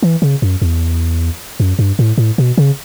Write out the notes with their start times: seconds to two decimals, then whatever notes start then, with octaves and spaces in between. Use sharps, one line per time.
0.03 E3
0.22 C#3
0.42 F#2
0.62 E2
1.60 F#2
1.79 G2
1.99 A2
2.18 A2
2.38 B2
2.58 C#3